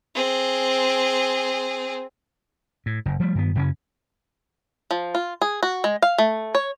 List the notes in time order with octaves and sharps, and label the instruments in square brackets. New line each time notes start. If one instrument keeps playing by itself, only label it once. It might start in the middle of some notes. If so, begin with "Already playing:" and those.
[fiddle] C4 G#4
[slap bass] A2
F#1
F3 G3 A3
G2 D#3 B3
F#2 C#3 C#4
[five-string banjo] F3
F4
G#4
F#4
G#3
F5
A3
C#5